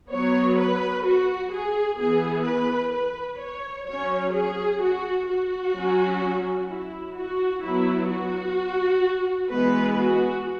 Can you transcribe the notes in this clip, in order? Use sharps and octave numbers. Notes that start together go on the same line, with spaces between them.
F#3 B3 C#5
B4
F#4
G#4
E3 B3 G#4
B4
B4
C#5
F#3 C#4 C#5
G#4
F#4
F#4
F#3 C#4
E4
F#4
F#3 B3 E4
F#4
E3 G#3 B3 B4
F#4